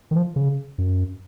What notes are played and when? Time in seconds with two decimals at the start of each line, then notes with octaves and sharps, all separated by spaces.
0.11 D#3
0.16 F3
0.36 C#3
0.78 F#2